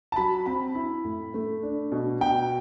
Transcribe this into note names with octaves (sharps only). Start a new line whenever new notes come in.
A5
F#3 B5
C4 B5
E4
A2
A3
D4
B2
B2 G5